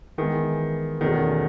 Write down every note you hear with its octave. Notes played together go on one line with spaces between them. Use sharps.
D#3 E3 G#3 B3
E2 B2 D#3 A3 C#4 G#4